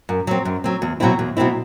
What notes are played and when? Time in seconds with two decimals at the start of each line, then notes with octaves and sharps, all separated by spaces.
0.09 F#2
0.27 F#3 C4
0.45 F#2
0.64 F#3 C4
0.82 E2
1.00 B2 F#3 C4 E4
1.19 E2
1.37 B2 F#3 C4 E4